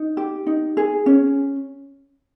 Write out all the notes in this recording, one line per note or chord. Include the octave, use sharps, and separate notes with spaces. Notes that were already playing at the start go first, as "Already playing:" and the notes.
Already playing: D#4
G4
D#4
G#4
C#4